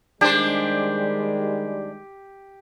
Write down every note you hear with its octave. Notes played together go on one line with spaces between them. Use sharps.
D#3 G3 G#3 D4 G4 C5